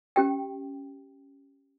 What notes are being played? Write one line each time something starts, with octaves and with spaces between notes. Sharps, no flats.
C#4 G4 G5